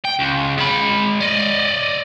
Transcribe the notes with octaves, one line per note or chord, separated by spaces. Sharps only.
G5
C#2
G#3 B5
D5 D#5